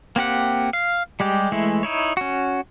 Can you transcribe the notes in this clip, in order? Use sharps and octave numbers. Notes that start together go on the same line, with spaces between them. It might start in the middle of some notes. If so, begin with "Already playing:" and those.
A#3 C4 G4 F#5
F5
G3 G#3 G4
E3 G#3 A3 E4
D#4 E4 C#5
C#4 F#4